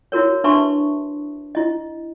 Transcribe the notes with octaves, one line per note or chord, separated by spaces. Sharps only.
E4 F#4 A#4 C#5
D4 B4 E5 A5 C6 C#6
E4 D#5